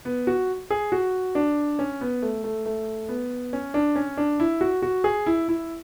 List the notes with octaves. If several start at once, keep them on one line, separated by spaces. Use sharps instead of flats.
B3
F#4
G#4
F#4
D4
C#4
B3
A3
A3
A3
B3
C#4
D4
C#4
D4
E4
F#4
F#4
G#4
E4
E4